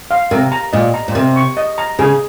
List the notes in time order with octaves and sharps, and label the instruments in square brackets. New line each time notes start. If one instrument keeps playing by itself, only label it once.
[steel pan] F5
[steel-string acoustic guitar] C3 [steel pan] A#4
[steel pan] A#5
[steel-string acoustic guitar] A#2 [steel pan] D#5
[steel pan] A#5
[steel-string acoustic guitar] A#2
[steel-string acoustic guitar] C3 [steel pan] A#4
[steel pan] C#6
D#5
A#5
[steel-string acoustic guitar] C#3 [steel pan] G#4